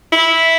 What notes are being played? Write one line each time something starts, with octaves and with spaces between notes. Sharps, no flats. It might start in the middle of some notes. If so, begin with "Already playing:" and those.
E4